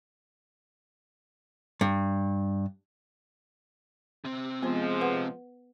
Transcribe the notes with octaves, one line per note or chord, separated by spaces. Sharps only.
G2
C3 C4
F3 G#3 B3 C5
B4 F#5